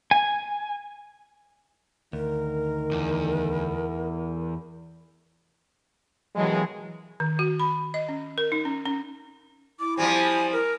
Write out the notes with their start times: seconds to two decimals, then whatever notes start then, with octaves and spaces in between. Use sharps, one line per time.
0.11 G#5
2.13 D2 D#3 A#4
2.91 E2
6.35 D#2 B2 E3 F#3 G#3
7.20 D#3
7.39 F#4
7.60 B5
7.94 D#5
8.09 C#4
8.38 A#4
8.52 D#4
8.65 C#4
8.86 C#4
9.80 E4 D6
9.97 F3 G3 C4 G#5
10.53 A#4